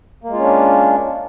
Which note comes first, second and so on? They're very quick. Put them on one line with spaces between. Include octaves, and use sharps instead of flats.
A#3 G#3 F4 C#4 D4